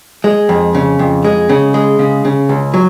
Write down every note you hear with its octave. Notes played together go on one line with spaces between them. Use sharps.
G#3
F2
C#3
F2
G#3
C#3
G#3
C#3
C#3
C#2
F#3